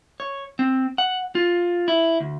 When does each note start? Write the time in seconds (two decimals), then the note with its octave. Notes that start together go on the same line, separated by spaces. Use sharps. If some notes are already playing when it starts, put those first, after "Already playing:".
0.20 C#5
0.59 C4
0.98 F#5
1.35 F4
1.88 E4
2.20 D2